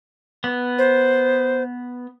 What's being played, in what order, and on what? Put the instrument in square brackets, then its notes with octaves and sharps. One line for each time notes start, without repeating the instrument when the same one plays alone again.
[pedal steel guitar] B3
[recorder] C5